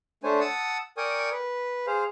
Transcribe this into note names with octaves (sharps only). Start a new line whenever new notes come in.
A3 D4 C5 C#5 G#5
F#5 A5 D#6 E6
A#4 D5 G5 G#5 C#6 D#6
B4
G#4 C5 F5